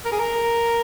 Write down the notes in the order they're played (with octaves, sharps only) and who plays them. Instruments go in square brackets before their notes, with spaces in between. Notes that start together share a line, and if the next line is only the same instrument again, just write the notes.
[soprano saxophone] A#4
G#4
A#4